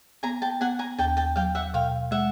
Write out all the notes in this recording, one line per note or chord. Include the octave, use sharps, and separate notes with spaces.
B3 G#5 A#5
G5 A5
B3 F#5 G#5
G#5 A#5
D#2 G5 A5
G5 A5
F#3 F5 G5
E5 F#5
B2 F5 G5
G#3 E5 F#5